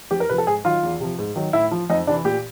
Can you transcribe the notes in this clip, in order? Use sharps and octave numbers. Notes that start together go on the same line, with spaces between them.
F2 G4
A#4
C3 F3 B4
A4
G#2 G#4
D#3 F#3 F4
E2
C3 F3
G#2
D#3 F#3
A2 E4
F3
F2 D#4
C3 E3 D4
A#2 G4